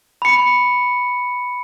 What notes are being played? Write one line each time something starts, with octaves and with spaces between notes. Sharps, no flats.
B5 C#7